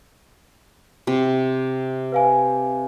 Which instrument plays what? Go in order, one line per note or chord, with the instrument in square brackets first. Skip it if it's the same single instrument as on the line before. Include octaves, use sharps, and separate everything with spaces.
[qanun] C3
[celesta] B4 F5 G#5